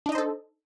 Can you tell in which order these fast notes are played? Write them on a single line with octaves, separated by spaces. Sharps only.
D4 D#4 D#5 C5 A4